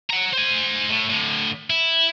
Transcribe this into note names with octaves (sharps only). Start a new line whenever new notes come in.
F#5 A#5
C5 G#5
A2
A2 D3
E4